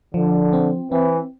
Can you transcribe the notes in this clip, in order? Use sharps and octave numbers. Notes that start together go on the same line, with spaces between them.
D3 F3
C4
E3 C4